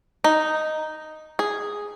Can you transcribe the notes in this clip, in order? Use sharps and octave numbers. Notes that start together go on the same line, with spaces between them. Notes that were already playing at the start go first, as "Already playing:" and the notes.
D#4
G#4